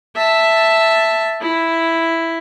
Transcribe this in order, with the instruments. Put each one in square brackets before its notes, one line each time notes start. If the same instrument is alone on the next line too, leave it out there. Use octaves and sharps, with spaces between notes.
[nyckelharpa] E5 A5
E4